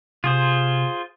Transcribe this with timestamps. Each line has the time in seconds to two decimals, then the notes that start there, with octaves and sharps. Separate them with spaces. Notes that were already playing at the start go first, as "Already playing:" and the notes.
0.24 C3 F4 G#4 C5